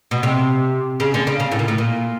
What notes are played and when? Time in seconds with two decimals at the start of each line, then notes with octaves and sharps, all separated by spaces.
0.11 B2
0.23 C3
1.00 C#3
1.14 D3
1.27 C#3
1.40 C#3
1.52 A2
1.59 A#2
1.68 A2
1.78 A#2